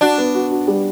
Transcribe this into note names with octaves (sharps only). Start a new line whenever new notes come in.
D4 F#4
B3
F#4
F#4
G3